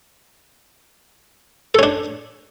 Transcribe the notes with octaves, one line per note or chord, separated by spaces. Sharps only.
C#4 D4 A4